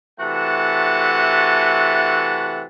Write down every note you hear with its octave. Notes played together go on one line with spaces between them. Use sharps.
C3 E3 A3 F#4 F#5 A5